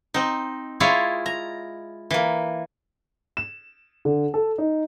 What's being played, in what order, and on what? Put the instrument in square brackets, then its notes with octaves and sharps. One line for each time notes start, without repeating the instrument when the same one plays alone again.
[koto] C4 D#4
G#3 E4 F4 C#5 F5
A#5
E3 A#3
[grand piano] E7
D3
A4
D#4